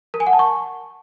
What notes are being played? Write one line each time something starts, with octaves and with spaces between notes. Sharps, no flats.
A#4
G#5
F#5
A5
C#6